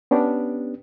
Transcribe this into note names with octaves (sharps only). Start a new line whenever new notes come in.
B3 C#4 D4 G4